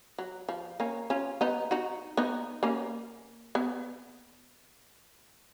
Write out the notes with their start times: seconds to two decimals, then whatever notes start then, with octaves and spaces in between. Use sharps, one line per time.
0.18 F#3
0.49 F3
0.80 A#3 C#4
1.10 C#4 F4
1.41 B3 D#4
1.71 D#4 F#4
2.17 B3 D#4
2.63 A#3 C#4
3.55 B3